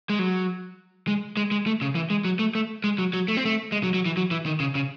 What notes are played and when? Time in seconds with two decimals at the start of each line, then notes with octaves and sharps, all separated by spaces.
0.09 G#3
0.19 F#3
1.08 G#3
1.37 G#3
1.51 G#3
1.66 A3
1.82 C#3
1.95 E3
2.10 G#3
2.25 F#3
2.39 A3
2.55 A3
2.84 G#3
2.98 F#3
3.14 F#3
3.28 A3
3.37 C4
3.45 A3
3.72 G#3
3.83 F#3
3.94 F#3
4.06 E3
4.17 F#3
4.31 E3
4.46 D#3
4.60 C#3
4.75 C#3